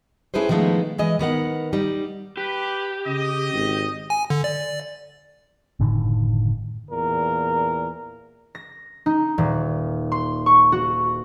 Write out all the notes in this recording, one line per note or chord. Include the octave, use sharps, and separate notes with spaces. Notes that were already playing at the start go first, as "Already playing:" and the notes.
C#4 E4 G#4 A4 B4 C5
D#3 F3 G#3 A3 B3
E3 G#3 D#5
D#3 B3 A#4 F#5
G3 D#4
G4 B4
C#3 D#5
G#1
G#5
D3
D5
F#1 A2 D3 D#3
E2 A#2 A#4
A#6
D#4
D#1
C6
C#6
F#4